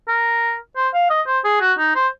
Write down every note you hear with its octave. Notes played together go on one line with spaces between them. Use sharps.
A#4
C5
F5
D#5
C5
G#4
F#4
D#4
C5